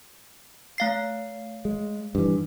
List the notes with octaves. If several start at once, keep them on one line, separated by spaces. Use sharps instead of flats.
A3 F5 C7
G#3
G2 E3